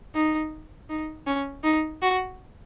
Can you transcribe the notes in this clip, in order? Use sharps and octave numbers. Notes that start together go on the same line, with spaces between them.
D#4
D#4
C#4
D#4
F#4